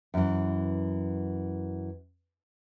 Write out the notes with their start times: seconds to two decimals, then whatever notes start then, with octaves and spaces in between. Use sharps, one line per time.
0.14 F#2 E3